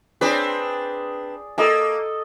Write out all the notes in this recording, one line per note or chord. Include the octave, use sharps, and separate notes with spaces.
C4 D4 G#4 B4 D5
A#3 A4 D#5 A5